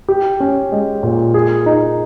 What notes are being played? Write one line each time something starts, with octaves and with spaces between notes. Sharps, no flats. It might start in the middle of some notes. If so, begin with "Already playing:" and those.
G4
C#4
G#3
A#2
G#4
D#4